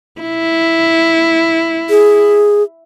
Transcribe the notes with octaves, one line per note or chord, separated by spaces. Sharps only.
E4
G#4